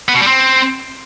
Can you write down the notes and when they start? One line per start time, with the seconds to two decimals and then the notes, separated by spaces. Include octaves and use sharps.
0.08 B3
0.15 B2
0.21 G3
0.27 C4